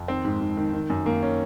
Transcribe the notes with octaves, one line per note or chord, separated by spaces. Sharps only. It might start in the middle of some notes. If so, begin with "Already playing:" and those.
Already playing: F2
D#3 C4
G#2
G#2
D#3
D#3
F#2
D#3 A#3
C#4